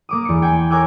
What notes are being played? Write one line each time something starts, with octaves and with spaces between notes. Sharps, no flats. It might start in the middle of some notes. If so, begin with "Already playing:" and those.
A#3 D6 D#6
E2 C#7
G5 G#5 D7
A#4 C#5 G#5 D6 E6 F#6